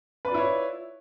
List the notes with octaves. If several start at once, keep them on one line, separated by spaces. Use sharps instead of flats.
E4 F4 B4 C#5 D5